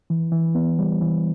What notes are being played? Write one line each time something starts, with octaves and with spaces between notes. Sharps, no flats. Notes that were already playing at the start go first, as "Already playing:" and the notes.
E3
E3
B3
G3
E3